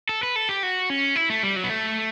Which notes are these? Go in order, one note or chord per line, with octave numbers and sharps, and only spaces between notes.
A4
B4
A4
G4
F#4
C#4
E4
A3
G3
F#3
B3
A3